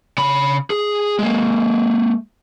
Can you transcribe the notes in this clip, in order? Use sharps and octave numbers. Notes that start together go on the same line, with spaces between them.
C#3 B5
G#4
G#3 A#3